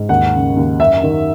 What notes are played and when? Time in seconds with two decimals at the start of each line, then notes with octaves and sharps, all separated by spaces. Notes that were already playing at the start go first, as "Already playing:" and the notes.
Already playing: G#2
0.09 D#2 F#5
0.33 C#3
0.56 D#2
0.80 F#2 E5
1.03 D#3